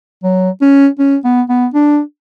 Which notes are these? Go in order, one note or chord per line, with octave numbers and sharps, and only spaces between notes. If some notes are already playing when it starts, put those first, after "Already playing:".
F#3
C#4
C#4
B3
B3
D4